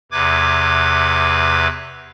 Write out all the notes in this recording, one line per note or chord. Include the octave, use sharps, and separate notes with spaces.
E2 C3 B4 D6 G#6